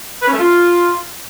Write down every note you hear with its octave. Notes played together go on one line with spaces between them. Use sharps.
B4
C#4
A3
F4